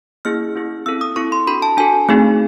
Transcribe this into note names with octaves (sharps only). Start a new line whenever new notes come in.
A#3 C#4 E4 G#4 F6
A#3 C#4 E4 G#4
C4 E4 A4 E6
D#6
C4 E4 A4 C#6
C6
D4 F#4 A4 B5
A5
D4 F#4 A4 G#5
A3 C4 D#4 G#4